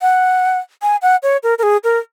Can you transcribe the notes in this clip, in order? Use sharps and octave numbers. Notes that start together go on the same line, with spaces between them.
F#5
G#5
F#5
C#5
A#4
A#4
G#4
A#4